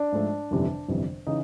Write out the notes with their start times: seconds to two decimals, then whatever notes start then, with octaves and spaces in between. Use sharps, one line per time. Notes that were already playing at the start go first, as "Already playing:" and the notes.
Already playing: D4 D5
0.12 G#2 F3 A3
0.51 G1 F2 C3 E3
0.88 G1 F2 C3 E3
1.27 C#3 E3 D#4 D#5